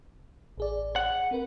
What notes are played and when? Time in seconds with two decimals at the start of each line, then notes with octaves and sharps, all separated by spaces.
0.58 A1 G#4 D5
0.96 F#5
1.31 C4 A#4 B4